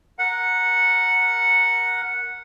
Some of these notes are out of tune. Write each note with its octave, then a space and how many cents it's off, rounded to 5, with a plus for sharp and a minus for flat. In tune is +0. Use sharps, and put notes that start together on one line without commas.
A#4 +0 F#5 -10